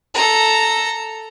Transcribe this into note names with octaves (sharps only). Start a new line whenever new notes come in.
A4 A#5